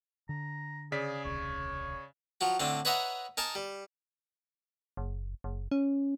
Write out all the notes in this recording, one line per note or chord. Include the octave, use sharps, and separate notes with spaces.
D3 A#5
C#3 G#4 D5 B6
D#1 C2 C#5
F3 F#3 F#4
A2 D3 C4 D4
B4 C#5 D#5 E5 F#5 A#5
D#4 A#4 G#5 A5
G3
F#1
F#1
C#4